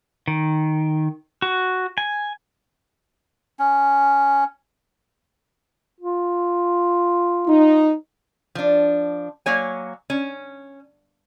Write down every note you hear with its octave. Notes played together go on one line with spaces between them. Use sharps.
D#3
F#4
G#5
C#4
F4
D#4
F3 D4
F#3 A#3 C#5 G#5
C#4